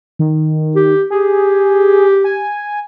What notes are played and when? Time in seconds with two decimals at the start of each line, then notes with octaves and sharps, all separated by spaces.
0.19 D#3
0.76 G4
1.10 G4 G#4
2.24 G#5